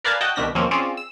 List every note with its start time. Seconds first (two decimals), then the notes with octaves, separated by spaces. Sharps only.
0.05 A#4 B4 D5 F5 G#5 A5
0.21 F#4 D#5 F#5 G5 A5
0.36 C2 B2 D#3 D4 A#6 B6
0.55 D#2 B2 F3 A#3 C4 C#4
0.71 C4 C#4 F4 G#4 D5
0.97 E6